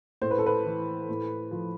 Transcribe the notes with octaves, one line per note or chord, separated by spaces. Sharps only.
A2 C5
B4
A4
B4
E3
A2
F3